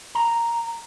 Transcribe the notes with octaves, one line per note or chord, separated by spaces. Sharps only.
A#5